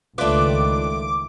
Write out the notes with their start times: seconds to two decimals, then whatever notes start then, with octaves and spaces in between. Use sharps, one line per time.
0.18 C#2 A2 D#3 A3 D4 F4 B4 D6